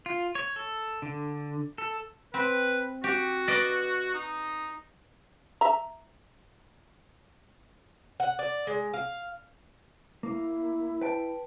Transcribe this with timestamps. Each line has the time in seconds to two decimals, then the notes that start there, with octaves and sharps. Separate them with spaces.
0.06 F4
0.35 C#5
0.56 A4
1.02 D3
1.78 A4
2.34 C4 B4
3.04 F#4 G4
3.48 B4 D5 D#5
4.14 D#4
5.61 E5 A#5
8.20 F#5
8.39 D5
8.67 G#3
8.93 F5
10.23 A#3 E4
11.01 B4 G5 A5